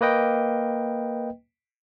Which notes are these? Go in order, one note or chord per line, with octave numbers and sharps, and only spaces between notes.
A#3 B4 D#5 G5